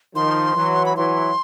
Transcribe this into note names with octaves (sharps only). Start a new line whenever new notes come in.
D#3 F3 C6
E3 F#3
B5
E3 F#3 C6